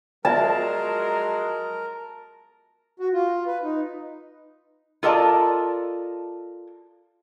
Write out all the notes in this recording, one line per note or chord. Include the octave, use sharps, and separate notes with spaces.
F3 F#3 G#3 F4 A#4 D5 E5 A5
F#4
F4
B4
D#4
F4 A4 A#4 D5 D#5 A5